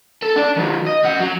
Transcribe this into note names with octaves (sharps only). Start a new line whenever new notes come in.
A4
D4 D5
D#3 F#3
D#5
F#2 F#5
F#3